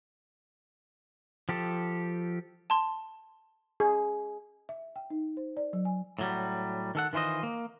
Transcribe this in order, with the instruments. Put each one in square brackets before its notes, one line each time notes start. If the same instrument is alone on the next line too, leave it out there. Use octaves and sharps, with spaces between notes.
[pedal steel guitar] F3 G4 A4
[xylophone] A5 C6
[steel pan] G#4
[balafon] E5
G5
D#4
C5
D5
F#3
G#5
[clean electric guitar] A2 F#3 G3
D#3 A4 F#5
D#3 E3 F4 C5 D#5
A#3